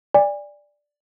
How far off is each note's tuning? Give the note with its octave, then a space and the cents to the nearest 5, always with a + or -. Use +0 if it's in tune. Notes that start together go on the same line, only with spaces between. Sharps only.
D5 +0 G#5 -35